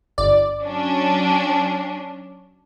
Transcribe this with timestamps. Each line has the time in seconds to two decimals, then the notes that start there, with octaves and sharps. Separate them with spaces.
0.18 G1 D5
0.63 F#3 C#4 D4